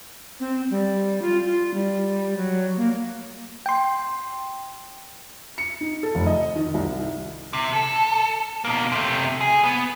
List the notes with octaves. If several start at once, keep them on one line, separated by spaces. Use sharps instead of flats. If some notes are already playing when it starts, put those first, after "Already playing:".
C4
G3
F4
F4
G3
F#3
A#3
G5 C6
C#7
D#4
A4
F1
D#5
D#3
C2
C3
A4
B2 A#3
C3 A3
G#4
B3